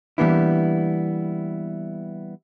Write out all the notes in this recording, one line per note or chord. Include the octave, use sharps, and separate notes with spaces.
E3 G3 A#3 B3 D4 E4